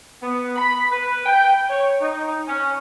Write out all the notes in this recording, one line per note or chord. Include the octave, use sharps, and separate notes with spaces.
B3
B5
B4
G5
C#5
D#4
C#4